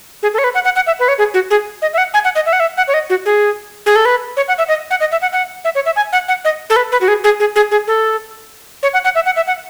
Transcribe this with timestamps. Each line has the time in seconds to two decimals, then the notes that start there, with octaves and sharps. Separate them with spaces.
0.23 G#4
0.34 A4
0.38 C#5
0.44 B4
0.55 F#5
0.65 F#5
0.76 F#5
0.87 E5
1.00 B4
1.08 C#5
1.18 G#4
1.34 F#4
1.50 G#4
1.82 D#5
1.94 E5
1.98 F#5
2.14 G#5
2.24 F#5
2.35 D#5
2.46 E5
2.53 F#5
2.60 E5
2.77 F#5
2.88 C#5
2.94 D#5
3.10 F#4
3.26 G#4
3.86 G#4
3.96 A4
4.05 B4
4.37 C#5
4.48 F#5
4.58 E5
4.68 D#5
4.91 F#5
5.00 D#5
5.12 E5
5.22 F#5
5.33 F#5
5.65 E5
5.75 C#5
5.86 E5
5.96 G#5
6.13 F#5
6.28 F#5
6.45 D#5
6.70 A4
6.76 B4
6.92 B4
7.01 F#4
7.08 G#4
7.24 G#4
7.40 G#4
7.56 G#4
7.71 G#4
7.88 A4
8.83 C#5
8.94 F#5
9.04 F#5
9.15 E5
9.26 F#5
9.36 E5
9.47 F#5